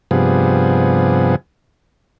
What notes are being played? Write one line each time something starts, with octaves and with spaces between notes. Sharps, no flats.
G2 C3 F3 B3 G#4